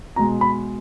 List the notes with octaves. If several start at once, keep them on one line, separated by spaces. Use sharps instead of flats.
B2 G#3 A#5
B5